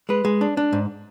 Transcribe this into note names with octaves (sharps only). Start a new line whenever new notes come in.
G#3 B4
G#3
D4
D4
G#2